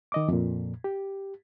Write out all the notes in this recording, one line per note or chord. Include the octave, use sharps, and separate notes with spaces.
D#3 D#5 D6
F2 A#2
G4